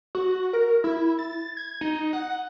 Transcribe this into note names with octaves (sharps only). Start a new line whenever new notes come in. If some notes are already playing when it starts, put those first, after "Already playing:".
F#4
A#4
E4
A6
G#6
D#4
F#5